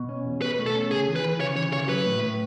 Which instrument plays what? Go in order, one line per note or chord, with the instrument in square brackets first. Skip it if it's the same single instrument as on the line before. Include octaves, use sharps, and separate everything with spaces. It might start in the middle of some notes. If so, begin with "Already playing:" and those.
Already playing: [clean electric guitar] B2
C#4
E2
[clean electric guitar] B2 [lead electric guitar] B4
[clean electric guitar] A3
[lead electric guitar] A4
[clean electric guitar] C#4
[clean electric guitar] C#2 [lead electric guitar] G#4
[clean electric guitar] E3
[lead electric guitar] B4
[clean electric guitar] E3
[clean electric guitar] C#3 [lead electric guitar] C#5
[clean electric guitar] E3 [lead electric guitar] C#5
[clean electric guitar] C#3 [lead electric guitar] C#5
[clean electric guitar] F#3 [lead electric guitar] B4
[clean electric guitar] A2
A2